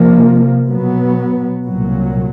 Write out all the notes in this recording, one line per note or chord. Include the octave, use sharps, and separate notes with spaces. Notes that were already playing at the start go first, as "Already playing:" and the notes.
Already playing: C3 F3 A#3
B2 F#3 B3
C2 A#2 F#3